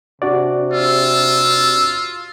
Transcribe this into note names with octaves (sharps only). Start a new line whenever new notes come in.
C3 D4 F#4 D5
F4 E6